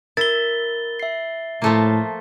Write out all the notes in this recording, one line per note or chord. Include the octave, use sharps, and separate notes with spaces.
E4 A#4 A6 G7
E5 C7
A2 F3 A3 A#3